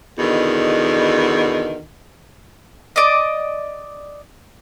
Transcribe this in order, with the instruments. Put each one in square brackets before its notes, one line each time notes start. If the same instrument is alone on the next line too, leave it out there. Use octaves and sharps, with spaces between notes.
[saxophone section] E2 B2 D3 D#3
[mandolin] D5 D#5